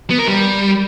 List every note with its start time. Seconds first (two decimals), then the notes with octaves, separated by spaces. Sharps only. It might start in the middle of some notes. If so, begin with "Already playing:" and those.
0.10 B3
0.19 A#4
0.27 G3